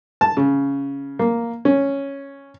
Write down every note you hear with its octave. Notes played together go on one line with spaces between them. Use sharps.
A5
C#3
A#3
C#4